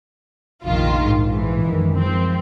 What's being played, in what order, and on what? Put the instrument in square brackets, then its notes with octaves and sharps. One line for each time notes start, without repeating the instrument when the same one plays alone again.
[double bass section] F1 A#1 [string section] D#3 F4
[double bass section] A#1 G#2
[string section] E3
[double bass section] F#2 D#3 G#3
[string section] F3 C4